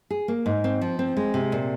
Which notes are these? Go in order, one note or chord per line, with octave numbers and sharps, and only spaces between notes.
G#4
A#3
G#2
C4
F3
C4
G#3
C3
A#2